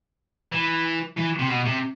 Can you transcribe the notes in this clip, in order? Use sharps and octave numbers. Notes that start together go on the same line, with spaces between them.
E3
E3
C3
B2
C3